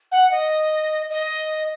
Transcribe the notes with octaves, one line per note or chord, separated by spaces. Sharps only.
F#5
D#5
D#5